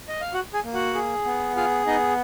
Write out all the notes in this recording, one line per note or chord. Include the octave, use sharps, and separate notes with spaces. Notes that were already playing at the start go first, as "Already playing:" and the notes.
D#5
F5
F#4 F#5
G#4 G#5
A#3
F#4 F#5
G#4
B3
F4 G#4 F5
B3 D#4 D#5